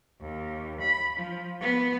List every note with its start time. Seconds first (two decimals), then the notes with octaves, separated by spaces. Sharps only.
0.21 D#2
0.80 B5
1.15 F3
1.60 B3